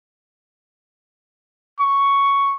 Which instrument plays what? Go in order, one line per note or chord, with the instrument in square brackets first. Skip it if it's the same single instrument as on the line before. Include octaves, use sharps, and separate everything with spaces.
[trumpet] C#6